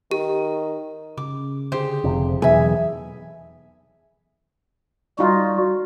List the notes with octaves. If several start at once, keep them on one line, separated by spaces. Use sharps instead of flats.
D#3 G4
C#3 D6
D3 G4 G#4 C5
F1 F2 C3
B1 E2 E3 G#4 E5 G#5
G3 D#4 F4 F#4